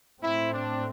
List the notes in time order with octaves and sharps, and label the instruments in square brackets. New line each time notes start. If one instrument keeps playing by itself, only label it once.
[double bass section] A2 A3 C4 [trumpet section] E4
[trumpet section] D4